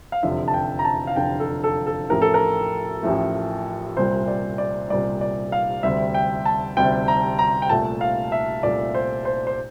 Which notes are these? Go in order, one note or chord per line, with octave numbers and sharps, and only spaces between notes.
F5
F1 E2 D3 F3 E5
A5
G5
A#5
A5
F5
F1 E2 D3 F3 G5
A4
A4
A4
A1 A2 F3 A3 A#4
A4
A#4
A1 A2 F3 A3
C2 A#2 G3 C5
D5
D5
C2 A#2 G3 D5
D5
F5
D2 C3 G3 E5
G5
A5
D2 C3 G3 G5
A#5
A#5
G5
C2 A#2 A3 A5
F5
E5
C2 A#2 A3 D5
C5
C5
C5